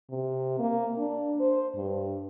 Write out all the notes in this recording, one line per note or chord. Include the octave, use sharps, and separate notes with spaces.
C3
A#3
D4
C5
G2